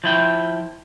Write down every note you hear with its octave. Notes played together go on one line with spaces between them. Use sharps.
F3 E4 G5